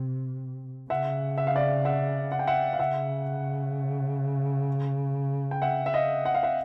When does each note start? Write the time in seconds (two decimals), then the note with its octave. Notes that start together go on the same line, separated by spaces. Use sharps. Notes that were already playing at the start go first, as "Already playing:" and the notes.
Already playing: C3
0.90 C#3 E5 F#5
1.38 E5
1.47 F5
1.55 D5 E5
1.85 E5 F#5
2.32 F#5
2.39 G5
2.47 E5 F#5
2.73 F5
2.79 C#3 E5 F#5
5.51 G5
5.62 E5 F#5
5.86 E5
5.94 D#5 F5
6.25 F#5
6.34 F5
6.43 E5 F#5